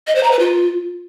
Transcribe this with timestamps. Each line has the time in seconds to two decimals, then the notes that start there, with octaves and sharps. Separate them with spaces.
0.07 D#5
0.15 C5
0.23 A#5
0.31 B4
0.39 F4